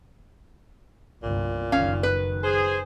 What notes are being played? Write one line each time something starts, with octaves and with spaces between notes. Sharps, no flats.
G1 C2 A#2
F#1 D#3 C#4 F5
B4
G#4 C5